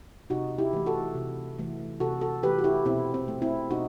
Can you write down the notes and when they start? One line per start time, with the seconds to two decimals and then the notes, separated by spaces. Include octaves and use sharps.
0.30 C3 D#4 F#4
0.58 E4 G4
0.73 E3 A3
0.86 F#4 A4
1.15 C3
1.58 E3 A3
2.00 C3 F#4 A4
2.21 F#4 A4
2.43 E3 A3 G4 B4
2.59 F#4
2.64 E4 G4
2.86 B2 C4 E4
3.14 C4
3.28 A3
3.42 C4 E4
3.70 B2 D#4 F#4